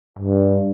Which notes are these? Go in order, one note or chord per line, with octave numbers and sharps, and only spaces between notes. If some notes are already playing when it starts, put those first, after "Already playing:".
G2